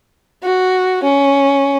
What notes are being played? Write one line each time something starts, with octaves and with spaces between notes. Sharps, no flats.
F#4
C#4